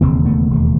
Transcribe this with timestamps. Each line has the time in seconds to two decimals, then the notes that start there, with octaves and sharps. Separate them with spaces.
0.01 E1 D#2 C#3 A#3 C4
0.25 A3 B3
0.50 E1 D#2 C#3